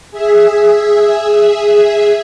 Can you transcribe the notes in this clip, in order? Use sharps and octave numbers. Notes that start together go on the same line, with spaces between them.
G#4 E5